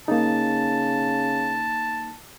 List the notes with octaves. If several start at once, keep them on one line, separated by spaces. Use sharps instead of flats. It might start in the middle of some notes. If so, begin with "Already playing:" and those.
C#3 A#3 D#4 A5